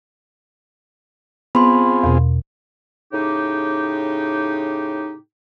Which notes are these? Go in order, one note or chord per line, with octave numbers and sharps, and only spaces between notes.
B3 C4 F4 G#4 B5 C6
E2 B2
A2 C#3 D#4 G4